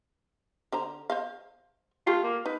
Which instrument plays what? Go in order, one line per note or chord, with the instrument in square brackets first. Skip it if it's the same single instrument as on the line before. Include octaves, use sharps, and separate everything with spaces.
[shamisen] D3 C5 A#5
C5 D#5 F5
[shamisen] A3 G4 [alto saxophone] F4
[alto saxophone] A#3
[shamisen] D#4 [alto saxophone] B4